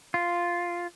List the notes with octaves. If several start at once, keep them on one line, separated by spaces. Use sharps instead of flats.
F4